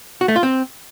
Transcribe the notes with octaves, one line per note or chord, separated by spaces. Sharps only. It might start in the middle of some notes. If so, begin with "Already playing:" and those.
F#4
A3
F4
C4